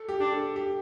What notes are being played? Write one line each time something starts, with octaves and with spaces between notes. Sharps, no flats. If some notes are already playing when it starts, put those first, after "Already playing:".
Already playing: A4
G4
D4
A4
G4